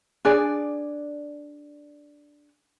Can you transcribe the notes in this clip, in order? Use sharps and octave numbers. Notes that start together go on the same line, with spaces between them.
D4 G#4 D5